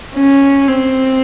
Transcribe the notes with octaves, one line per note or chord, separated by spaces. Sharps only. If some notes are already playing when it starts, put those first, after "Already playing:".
C#4
C4